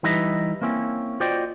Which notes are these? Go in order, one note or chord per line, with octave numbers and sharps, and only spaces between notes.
E3 G3 D#4 E4 B4 D#5
A#3 C4 C#4 E4
F4 F#4 C5 D5 D#5 G5